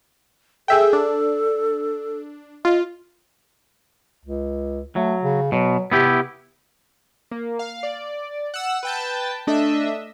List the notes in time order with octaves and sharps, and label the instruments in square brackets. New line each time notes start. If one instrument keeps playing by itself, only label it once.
[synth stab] G#4 E5 G5 [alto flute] A4
[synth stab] D4
[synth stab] F4 [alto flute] D#5
[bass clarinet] C#2
[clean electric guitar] F#3 [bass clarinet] A3
[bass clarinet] C#3
[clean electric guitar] B2 [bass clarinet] F#3
[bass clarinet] C3 [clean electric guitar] B3 E4 G4
[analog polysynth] A#3
F5
D5
F#5 E6
B4 G5 A5
A3 D4 D#5 E5